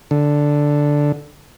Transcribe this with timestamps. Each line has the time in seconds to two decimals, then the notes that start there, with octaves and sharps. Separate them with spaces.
0.11 D3